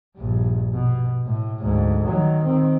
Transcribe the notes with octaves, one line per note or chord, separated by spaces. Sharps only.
A#1 G2
B2
A2
D2 G#2
D#3 F#3
D#3 C4